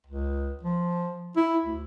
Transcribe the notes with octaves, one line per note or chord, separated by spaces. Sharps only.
C#2
F3
E4
D2